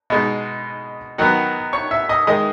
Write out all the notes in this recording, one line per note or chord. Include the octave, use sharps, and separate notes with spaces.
B2 G#3 D#4
D#3 F#3 B3 F#4 F#5
C#5 C#6
E5 E6
D#5 D#6
D#3 G#3 D#5 D#6